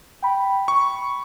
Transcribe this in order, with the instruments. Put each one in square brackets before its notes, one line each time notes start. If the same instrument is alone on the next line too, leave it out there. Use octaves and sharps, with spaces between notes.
[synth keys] G5 B5
[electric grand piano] C#6